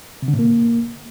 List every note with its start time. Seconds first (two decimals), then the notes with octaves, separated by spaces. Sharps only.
0.22 C3
0.28 D3
0.33 A2
0.39 A#3